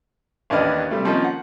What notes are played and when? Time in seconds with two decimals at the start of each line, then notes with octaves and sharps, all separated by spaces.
0.50 A1 D#2 D4 B4 D#5 F6
0.90 C3 G3 A3
1.05 D#3 F3 A#3 C#4 D#4
1.24 F#5